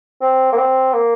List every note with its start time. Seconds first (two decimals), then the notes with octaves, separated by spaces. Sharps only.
0.21 C4
0.52 A#3
0.57 C4
0.93 A#3